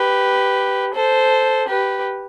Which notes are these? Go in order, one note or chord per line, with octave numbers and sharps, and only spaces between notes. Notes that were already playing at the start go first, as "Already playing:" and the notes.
Already playing: G4 B4
A4 C5
G4 B4